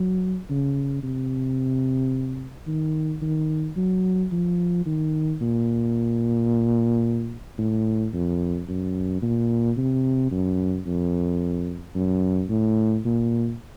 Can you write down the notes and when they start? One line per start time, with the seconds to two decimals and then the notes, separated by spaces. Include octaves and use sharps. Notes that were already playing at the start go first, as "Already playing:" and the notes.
Already playing: F#3
0.50 C#3
1.03 C3
2.67 D#3
3.22 D#3
3.76 F#3
4.32 F3
4.86 D#3
5.41 A#2
7.58 A2
8.13 F2
8.68 F#2
9.22 A#2
9.77 C3
10.31 F#2
10.86 F2
11.95 F#2
12.50 A2
13.05 A#2